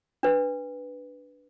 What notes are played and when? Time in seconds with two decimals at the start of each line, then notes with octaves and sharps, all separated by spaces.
0.23 D4 B4